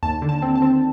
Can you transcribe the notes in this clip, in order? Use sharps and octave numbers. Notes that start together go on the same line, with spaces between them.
D#2 A5
D3
A5
C4
A5
C4